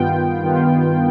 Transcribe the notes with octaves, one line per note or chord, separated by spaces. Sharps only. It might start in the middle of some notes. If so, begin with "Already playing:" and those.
Already playing: G2 D#3 B3 F4 G5
G2 D#3 B3 F4